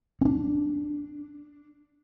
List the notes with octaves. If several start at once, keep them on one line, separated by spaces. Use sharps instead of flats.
C#4 D4